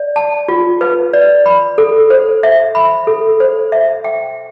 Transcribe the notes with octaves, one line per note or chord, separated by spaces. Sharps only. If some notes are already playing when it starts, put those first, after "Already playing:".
Already playing: D5
A5
F4
B4
D5
B5
A4
C5
E5
B5
A4
C5
E5
G5